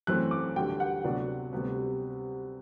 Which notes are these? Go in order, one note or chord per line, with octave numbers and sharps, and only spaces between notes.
F#2 E3 A3 C4 F#6
D6
D2 D3 G3 G5
F#5
D2 C3 F#3 B3 D4
D2 C3 G3 B3